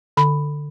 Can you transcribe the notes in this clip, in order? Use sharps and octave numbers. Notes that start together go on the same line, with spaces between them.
D3 B5